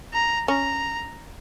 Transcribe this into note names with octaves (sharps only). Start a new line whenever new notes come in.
A#5
C#4 A#5